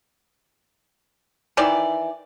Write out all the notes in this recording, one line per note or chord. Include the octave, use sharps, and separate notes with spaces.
D#3 E3 D5